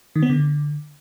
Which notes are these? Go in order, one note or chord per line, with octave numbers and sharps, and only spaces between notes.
D#3
B3
D3